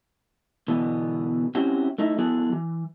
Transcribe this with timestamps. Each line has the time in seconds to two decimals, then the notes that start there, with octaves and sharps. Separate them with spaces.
0.68 B2 D3 E3 B3
1.55 C4 C#4 E4 F#4 G4
1.98 A3 D#4 E4
2.19 F3 B3 E4 F#4 G#4 A4
2.52 E3